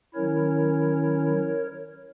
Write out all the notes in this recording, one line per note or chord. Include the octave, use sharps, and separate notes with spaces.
D#3 F#3 C#4 E4 A#4 C#5